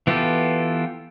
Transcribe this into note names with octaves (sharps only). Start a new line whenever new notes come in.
E3 B3 F4 G4 A4